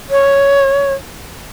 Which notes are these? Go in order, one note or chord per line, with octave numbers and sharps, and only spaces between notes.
C#5